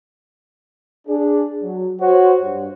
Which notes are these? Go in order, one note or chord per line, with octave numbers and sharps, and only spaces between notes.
D4 G#4
F#3
F#4 C5 C#5
G2